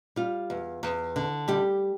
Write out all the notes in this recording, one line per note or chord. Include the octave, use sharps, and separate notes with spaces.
G3 F4
E2
E2
D3
G3 G4